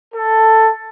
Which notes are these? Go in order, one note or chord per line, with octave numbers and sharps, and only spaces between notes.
A4